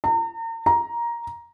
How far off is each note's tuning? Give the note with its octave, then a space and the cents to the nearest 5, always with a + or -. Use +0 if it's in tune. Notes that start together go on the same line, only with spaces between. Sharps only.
A#5 -40
A#5 +10